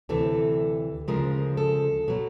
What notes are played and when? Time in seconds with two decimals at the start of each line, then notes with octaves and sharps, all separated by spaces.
0.09 D2 C3 E3 A4
1.08 D2 C#3 F3 G#3 A#4
1.57 A4
2.08 B2 F#3